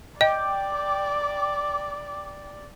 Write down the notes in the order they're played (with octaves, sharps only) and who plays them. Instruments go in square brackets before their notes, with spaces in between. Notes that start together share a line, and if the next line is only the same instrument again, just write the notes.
[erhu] D5 [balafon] D#5 [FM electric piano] G5 [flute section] D6